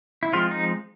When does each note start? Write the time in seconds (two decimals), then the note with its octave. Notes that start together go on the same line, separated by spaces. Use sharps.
0.23 E4
0.33 F3 G#3 C4 F4
0.51 D#4